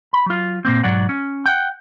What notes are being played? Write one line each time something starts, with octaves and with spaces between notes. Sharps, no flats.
B5
F#3 F4
A#2 A#3 C4
B1 G#2 F#3 D5 F#5
C#4
F#5 G5